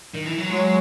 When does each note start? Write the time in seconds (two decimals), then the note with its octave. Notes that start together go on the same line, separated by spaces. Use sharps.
0.14 D#3
0.26 E3
0.38 F#3
0.50 F#3 G#3